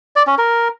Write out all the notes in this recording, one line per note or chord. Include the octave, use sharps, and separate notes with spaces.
D5
C#4
A#4